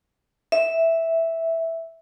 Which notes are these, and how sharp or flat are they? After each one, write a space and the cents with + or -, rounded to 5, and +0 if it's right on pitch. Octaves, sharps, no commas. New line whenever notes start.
E5 -5